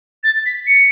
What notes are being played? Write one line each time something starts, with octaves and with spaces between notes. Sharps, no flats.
A6
B6
C#7